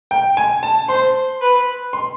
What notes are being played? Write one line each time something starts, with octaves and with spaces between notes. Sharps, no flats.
G5
G#5
A5
C5 C6
B4
C6